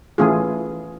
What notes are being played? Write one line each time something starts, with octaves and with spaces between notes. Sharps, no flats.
E3 A3 C#4 F4 G#4